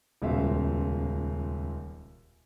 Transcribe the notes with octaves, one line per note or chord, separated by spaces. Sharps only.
D#1 C#2 B2 E5 F5